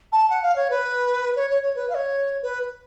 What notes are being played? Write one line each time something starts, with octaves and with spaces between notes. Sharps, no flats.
A5
F#5
F5
C#5
B4
C#5
C#5
C#5
B4
F5
C#5
B4